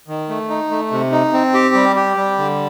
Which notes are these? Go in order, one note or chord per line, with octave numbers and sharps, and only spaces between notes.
D#3
A3
D#4
A3
C3
D#4
C4
G4
G3
G4
G3
D3